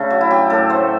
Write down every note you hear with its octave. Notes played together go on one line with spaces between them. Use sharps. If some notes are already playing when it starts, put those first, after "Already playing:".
Already playing: C#3 A3 D4
F#3
E4
F#3 G4
A2 A4
A3 C5